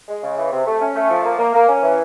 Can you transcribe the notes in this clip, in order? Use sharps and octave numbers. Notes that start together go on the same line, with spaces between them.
G#3
C#3
E3
C3
A3
C#4
A3
F3
A#3
A#3
A#3
C#4
E3